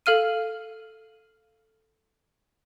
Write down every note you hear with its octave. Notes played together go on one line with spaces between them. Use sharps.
A4 F5 F6 D#7